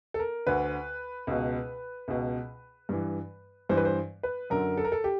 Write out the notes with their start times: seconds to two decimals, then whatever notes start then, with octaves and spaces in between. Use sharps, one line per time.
0.14 A4
0.19 A#4
0.47 D2 D3 B4
1.27 C#2 B2
2.08 C#2 B2
2.89 G2 E3
3.69 G2 E3 C5
3.77 B4
3.85 C5
4.23 B4
4.50 F#2 D3 A#4
4.77 A4
4.85 A#4
4.92 A4
5.04 G4